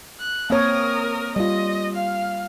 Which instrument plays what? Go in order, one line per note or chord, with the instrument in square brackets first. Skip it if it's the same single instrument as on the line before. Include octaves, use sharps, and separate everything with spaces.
[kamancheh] F#6
[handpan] A#3 C4 C#5 [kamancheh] A#4 D#6
[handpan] G3 F4 [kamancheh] D#5
[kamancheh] F5